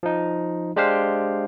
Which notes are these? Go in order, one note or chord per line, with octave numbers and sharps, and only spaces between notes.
F3 D#4
G#3 D4 G4 C5 F5